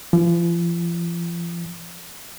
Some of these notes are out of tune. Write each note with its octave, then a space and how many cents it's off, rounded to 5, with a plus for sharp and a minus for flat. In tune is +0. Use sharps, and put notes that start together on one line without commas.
F3 -40